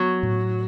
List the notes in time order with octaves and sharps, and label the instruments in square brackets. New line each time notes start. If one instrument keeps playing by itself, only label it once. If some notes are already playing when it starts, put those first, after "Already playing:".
Already playing: [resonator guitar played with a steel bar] F#3 [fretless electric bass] B3
[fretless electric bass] A2